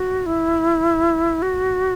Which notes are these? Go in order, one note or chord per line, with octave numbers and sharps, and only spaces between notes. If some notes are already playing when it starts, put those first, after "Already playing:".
Already playing: F#4
E4
F#4